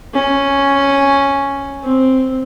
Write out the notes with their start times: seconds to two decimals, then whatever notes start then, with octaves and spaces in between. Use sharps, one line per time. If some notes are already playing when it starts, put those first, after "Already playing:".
0.14 C#4
1.82 C4